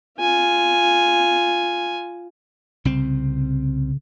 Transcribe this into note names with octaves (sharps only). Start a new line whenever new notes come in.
F4 G#5
C2 C#3 C4